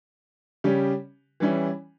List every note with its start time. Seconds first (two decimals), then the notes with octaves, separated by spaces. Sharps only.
0.64 C#3 G3 C#4 G4
1.40 E3 G3 C#4 E4